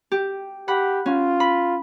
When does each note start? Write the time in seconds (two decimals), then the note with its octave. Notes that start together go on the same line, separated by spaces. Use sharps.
0.12 G4
0.68 G4 F#5 B5
1.06 C#4 F4
1.40 B5